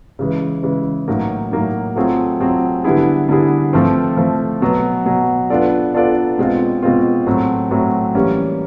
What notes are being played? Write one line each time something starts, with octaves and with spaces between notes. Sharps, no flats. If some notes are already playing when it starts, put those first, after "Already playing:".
C#3 E3 G#3
C#3 E3 G#3
A2 F#3 A#3 D#4
A2 F#3 A#3 D#4
F#3 A3 C4 F4 G#4
F#3 A3 C4 F4 G#4
D3 G3 B3 E4 G#4
D3 G3 B3 E4 G#4
F3 A3 C4
F3 A3 C4
B2 F#3 B3
B2 F#3 B3
B3 D4 F4 A4 D5
B3 D4 F4 A4 D5
B2 G#3 C4 F4
B2 G#3 C4 F4
A2 F#3 A3 C4
A2 F#3 A3 C4
E3 G3 A#3 C#4